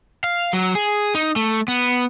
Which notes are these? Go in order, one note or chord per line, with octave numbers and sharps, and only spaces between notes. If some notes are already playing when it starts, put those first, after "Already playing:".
F5
F#3
G#4
D#4
A3
B3